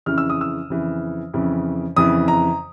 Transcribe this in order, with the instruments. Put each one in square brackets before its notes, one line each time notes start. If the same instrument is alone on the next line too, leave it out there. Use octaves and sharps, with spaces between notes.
[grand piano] F2 C#3 E3 F6
E6
D#6
E6
F2 C#3 E3
F2 C#3 E3
F2 C#3 E3 D#6
A#5